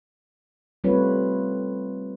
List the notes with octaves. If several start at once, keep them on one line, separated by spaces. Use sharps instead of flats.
G3 A3 C4 F4 B4 C#5